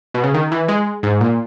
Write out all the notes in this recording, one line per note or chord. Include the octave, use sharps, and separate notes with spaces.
B2
C#3
D#3
E3
G#3
G#2
A#2